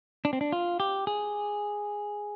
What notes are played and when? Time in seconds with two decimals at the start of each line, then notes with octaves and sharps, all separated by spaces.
0.25 D4
0.33 C4
0.41 D4
0.52 F4
0.80 G4
1.07 G#4